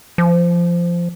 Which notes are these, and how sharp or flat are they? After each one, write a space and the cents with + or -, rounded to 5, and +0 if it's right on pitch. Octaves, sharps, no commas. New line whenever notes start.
F3 -15